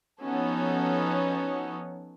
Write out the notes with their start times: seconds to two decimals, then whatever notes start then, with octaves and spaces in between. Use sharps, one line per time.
0.21 F3 B3 C#4 D#4 F#4 A4